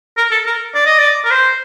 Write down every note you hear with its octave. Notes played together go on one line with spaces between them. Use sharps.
A#4
A4
A#4
D5
D#5
D5
A#4
C5